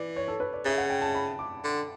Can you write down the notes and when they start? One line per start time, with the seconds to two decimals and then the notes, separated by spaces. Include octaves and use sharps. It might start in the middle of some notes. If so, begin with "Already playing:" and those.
Already playing: E3 D5
0.16 C#5
0.28 A4
0.40 B4
0.53 D5
0.65 C#3 E5
0.78 F#5
0.90 G5
1.02 A5
1.15 B5
1.39 D6
1.64 D3